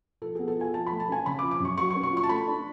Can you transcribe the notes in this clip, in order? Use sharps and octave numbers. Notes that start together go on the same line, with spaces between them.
F3 A4
B3 G#4
A4
F4 G#5
F3 A5
A3 B5
A5
C#4 G#5
C#3 B5
D6
F3
D6
F#2 C#6
F#3 C#6
C#6
C#4
C#6
F4
C#6
A5
A3 B5
D4